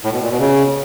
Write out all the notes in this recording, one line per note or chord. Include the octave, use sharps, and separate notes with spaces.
A2
B2
A#2
B2
C#3